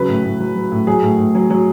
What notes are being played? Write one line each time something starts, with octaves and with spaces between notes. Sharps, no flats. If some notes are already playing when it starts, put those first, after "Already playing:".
Already playing: C#3 F#3 B4
A2
A2
F#3
F#3
A2
F#3 G#4
A2
A2
F#3
F#3